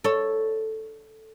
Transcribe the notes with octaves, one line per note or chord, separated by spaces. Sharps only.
A4 C#5